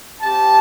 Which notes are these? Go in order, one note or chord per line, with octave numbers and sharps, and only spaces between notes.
C4 G4 A5